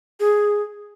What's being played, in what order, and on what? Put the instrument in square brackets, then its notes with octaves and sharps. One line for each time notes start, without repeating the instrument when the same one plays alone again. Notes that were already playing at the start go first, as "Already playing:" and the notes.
[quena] G#4